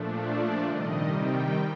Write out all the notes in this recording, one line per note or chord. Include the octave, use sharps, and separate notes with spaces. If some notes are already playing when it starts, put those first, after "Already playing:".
Already playing: A#2 F3 A3 D4
D5
C3 D#3 G3 D#5
G5